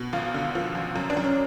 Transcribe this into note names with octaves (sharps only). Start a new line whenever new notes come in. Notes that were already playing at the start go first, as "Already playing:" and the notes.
Already playing: B2
G#1 F4
D3
F3
G#1
F#2
D4
F#2
C#4